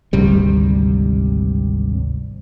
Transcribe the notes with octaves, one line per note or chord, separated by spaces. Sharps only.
G#1 D2 C3 G3